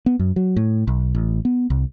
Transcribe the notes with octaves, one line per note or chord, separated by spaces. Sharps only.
B3
F#2
F#3
A2
B1
A1
B3
C2